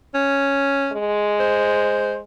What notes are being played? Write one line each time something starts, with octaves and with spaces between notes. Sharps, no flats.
C#4
G#3
C5